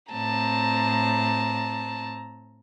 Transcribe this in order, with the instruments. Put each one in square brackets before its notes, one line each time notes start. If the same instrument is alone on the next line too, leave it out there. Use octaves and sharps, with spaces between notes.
[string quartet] A2 C4 A5 A#5